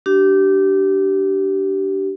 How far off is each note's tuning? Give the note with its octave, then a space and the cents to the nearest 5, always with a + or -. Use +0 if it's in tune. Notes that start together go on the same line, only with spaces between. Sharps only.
D4 +0 G4 -25